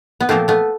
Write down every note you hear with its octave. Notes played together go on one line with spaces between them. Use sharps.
B3
A#2 F3 A3 A#3 C4
A3 B3